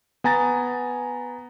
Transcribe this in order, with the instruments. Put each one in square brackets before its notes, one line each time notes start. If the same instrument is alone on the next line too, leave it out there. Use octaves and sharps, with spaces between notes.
[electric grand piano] B3 G#5 A#5 A6